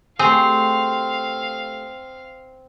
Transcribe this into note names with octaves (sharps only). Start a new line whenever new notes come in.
A3 C4 G4 G#4 F5